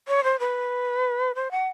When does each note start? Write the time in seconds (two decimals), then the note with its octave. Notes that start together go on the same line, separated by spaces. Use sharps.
0.08 C#5
0.24 C5
0.40 B4
1.35 C5
1.51 F#5